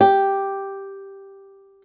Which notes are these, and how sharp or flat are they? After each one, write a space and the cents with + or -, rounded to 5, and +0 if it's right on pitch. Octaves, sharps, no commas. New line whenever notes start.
G4 +0